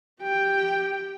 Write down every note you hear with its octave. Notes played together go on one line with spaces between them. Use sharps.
G4 G5